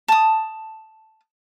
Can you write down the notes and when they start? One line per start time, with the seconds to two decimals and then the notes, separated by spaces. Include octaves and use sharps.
0.08 A5 D#6